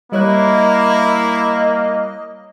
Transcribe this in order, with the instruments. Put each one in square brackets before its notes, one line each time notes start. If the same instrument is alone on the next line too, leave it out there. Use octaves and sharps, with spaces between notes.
[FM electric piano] G3 C#5 F#6 [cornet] A#3 [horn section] E4 [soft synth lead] D#5